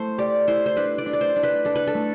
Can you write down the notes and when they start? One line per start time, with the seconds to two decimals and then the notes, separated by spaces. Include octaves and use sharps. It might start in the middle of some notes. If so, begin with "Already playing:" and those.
Already playing: A3 E4 C5
0.18 G4 D5
0.47 E4 C5
0.66 C5
0.77 D4 B4
0.98 D5
1.06 D4
1.13 D5
1.21 C5
1.36 D4
1.43 B4
1.65 D4 A4
1.76 B4
1.87 A4
1.94 A3